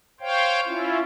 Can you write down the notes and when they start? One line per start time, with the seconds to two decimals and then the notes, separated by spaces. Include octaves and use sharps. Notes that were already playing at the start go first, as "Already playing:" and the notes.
0.20 C5 C#5 F5 G5
0.67 C#4 E4 F4